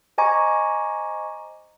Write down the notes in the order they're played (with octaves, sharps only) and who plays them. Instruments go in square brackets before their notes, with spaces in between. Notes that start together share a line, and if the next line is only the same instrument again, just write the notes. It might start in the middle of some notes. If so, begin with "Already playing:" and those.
[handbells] C5 D#5 G#5 A#5 C#6 D6